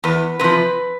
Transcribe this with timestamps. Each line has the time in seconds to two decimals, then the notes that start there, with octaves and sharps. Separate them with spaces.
0.04 E2 B4
0.39 C3 F3 B4